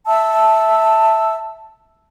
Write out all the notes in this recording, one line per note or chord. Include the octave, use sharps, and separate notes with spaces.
E5 A5 E6